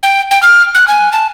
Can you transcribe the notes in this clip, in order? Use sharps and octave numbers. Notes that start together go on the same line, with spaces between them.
G5
G5
F6
F#6
G#5
A5